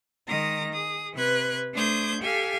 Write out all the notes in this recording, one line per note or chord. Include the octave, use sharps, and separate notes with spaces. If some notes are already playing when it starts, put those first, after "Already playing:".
D#3 G#3 A#5 D#6 A#6
G#4 D#6
C3 B4 F#6 G#6
A3 D4 C5 D#6 G6 G#6
G4 A4 F5 G#5